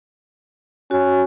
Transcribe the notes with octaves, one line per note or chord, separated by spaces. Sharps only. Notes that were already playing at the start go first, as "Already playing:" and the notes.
C#4 F#4